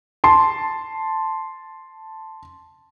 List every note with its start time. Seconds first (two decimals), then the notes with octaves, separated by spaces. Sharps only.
0.24 A5 C6